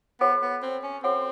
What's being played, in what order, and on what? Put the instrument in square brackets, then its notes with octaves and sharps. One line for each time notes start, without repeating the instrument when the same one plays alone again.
[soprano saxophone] B3 [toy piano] F#4 A4 C#5 F#5
[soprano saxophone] B3
C4
C#4
[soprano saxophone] C4 [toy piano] F#4 A4 C#5 F#5